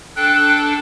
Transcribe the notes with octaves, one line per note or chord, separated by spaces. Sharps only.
D4 A4 G5 F#6